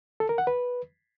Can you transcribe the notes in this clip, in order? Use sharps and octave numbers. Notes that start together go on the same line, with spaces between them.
A4
A#4
F#5
B4